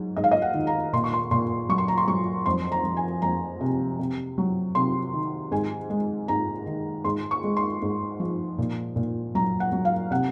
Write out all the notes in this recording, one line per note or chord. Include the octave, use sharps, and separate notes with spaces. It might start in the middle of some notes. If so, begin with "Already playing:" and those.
Already playing: G#2 F#3
G#2 D#5
F5
D#5
F#5
D#3
A#5
A#2 C6
C#6
C6
A#2 C6
F#3 C#6
C6
A#5
C6
F#3 C#6
F2 C6
A#5
F3
G#5
F2 A#5
C3
C3
F#3
C3 C6
D#3
G#2 G#5
G#3
G#2 A#5
D#3
G#2 C6
C#6
G#3
C6
G#2
F3
A#2
A#2
F#3 A#5
F#5
F#3
F5
C3 F#5